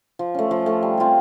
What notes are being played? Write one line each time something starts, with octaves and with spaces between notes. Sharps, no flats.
F3
A3 C#4
F3
A3 C#4
G3
C4 F4 G#4